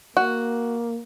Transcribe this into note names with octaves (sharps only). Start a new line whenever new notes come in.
A#3 F#4